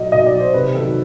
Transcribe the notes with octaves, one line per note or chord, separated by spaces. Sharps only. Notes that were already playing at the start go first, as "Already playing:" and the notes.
Already playing: B2 F#3 D5 D#5
B2 D#5
D5
F#3
C5
C3 B4
D#3 F#3 A4